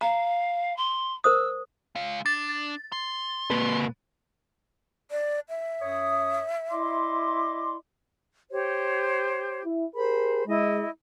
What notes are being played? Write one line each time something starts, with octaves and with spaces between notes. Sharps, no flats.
F5 A#5
C6
A#4 C5 D#6 E6
G#3 F5
D4 A6
C6
A#2 B4
D5
E5
F#2 C#5 D#6
E4 D5 D#5 C6 D6
G4 C5 C#5
E4
G4 G#4 A#4 C5 B5
G#3 E4 D#5